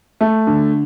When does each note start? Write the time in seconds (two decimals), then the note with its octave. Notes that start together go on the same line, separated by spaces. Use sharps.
0.21 A3
0.47 D3